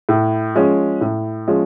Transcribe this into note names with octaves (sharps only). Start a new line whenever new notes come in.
A2
F3 G#3 C#4
A2
F3 G#3 C#4